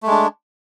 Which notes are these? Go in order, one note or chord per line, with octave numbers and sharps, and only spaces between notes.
G#3 A3 D4